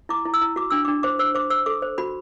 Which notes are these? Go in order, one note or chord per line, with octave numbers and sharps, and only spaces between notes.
E4 D6
E4
E6
E4
F#4 D6
D4 E6
D4 D6
C5 D6
C5 E6
C5 D6
C5 E6
A4 D6
C5
F#4 B5